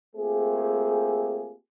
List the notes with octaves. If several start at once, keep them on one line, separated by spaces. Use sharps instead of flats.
A3 A#3 C4 F4 G4 G#4